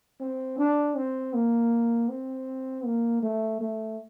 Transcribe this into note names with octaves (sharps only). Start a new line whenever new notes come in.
C4
D4
C4
A#3
C4
A#3
A3
A3